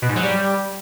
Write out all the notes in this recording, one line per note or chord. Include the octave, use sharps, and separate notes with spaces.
B2
G#2
F#3
G3